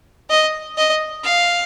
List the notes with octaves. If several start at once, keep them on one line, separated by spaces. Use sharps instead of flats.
D#5
D#5
F5